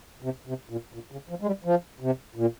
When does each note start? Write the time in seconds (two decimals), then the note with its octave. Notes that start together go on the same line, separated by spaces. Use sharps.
0.22 C3
0.47 C3
0.70 A#2
0.94 A#2
1.12 C#3
1.29 F3
1.41 G#3
1.46 G3
1.64 F3
2.00 C3
2.36 A#2